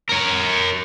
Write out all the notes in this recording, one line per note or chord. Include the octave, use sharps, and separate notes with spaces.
A#4 C#5